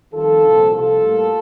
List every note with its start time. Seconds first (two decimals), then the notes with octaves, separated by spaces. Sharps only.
0.13 F2 D#3 G3 F4 A4
0.42 C2 A#2 F3 C4
0.72 C2 C3 F3 F4 A4
1.02 A2 G3 A#3